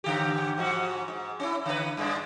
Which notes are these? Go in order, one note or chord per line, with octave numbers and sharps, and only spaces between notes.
G#2 D3 G4
G#2 F3 F#4
G#2
C#4 E4
D3 B4
G2 G#3 D4